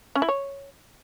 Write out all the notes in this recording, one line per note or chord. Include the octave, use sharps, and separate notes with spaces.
C#4
E4
C#5